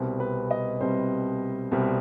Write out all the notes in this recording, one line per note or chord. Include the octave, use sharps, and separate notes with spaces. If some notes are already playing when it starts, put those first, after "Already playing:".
Already playing: C2 B2 G3 C4
B4
D#5
C2 B2 G3 C4 C5
C2 B2 G3 C4